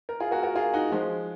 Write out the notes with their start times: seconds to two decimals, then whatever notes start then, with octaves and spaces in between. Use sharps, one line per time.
0.09 A#4
0.20 F4 G#4
0.31 F#4 A#4
0.43 F#4 A#4
0.55 F4 G#4
0.73 D#4 F#4
0.92 F3 G#3